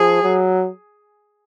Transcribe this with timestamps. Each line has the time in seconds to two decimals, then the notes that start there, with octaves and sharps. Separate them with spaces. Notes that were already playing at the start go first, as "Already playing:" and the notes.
Already playing: F3 G#4
0.24 F#3